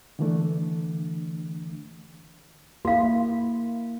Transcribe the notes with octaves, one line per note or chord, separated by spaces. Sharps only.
D3 E3 A3 D4
A#3 E4 F#4 F5